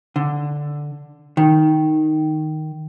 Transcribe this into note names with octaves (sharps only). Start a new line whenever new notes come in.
D3
D#3